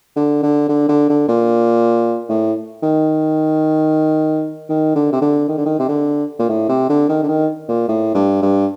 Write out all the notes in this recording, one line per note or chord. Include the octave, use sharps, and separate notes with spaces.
D3
D3
D3
D3
D3
A#2
A2
D#3
D#3
D3
C3
D3
D#3
D3
D#3
C3
D3
A#2
A2
C3
D3
D#3
D3
D#3
A#2
A2
G2
G2